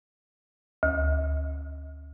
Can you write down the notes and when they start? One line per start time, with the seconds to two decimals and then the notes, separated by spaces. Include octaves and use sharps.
0.83 D2